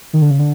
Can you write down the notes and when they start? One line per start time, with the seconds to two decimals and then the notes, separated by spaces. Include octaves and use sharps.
0.13 D#3
0.21 D3
0.31 C#3
0.39 D3